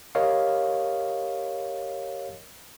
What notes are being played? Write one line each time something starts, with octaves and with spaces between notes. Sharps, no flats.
G4 A#4 C#5 D#5 F5